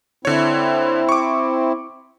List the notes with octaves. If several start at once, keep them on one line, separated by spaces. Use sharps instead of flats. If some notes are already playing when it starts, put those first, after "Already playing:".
D3 C4 E4 C#5
C#6 D6